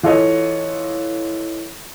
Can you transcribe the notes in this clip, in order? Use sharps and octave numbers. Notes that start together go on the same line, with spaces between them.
E3 F4 A4 C#5 D#5